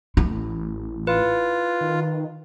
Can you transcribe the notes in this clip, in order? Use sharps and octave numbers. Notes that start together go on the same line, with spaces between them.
A1 E4
F4 B4
D#3